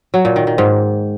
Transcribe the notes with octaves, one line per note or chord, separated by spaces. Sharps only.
F#3
A#2
D#3
D#3
G#2